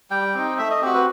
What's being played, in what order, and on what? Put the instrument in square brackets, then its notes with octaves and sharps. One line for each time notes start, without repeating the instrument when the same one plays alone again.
[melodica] G3 G5
C4 D#4
A3 E5
D#5
C4 F#4 G4
B4